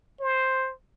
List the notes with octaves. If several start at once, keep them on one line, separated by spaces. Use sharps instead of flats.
C5